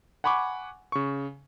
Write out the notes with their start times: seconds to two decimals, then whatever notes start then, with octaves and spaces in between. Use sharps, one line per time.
0.24 F#5 G#5 B5 C#6 D6
0.92 C#3 C#6